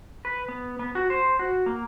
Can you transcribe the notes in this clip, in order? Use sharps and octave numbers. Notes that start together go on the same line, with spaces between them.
B4
B3
B3
F#4
C5
F#4
A#3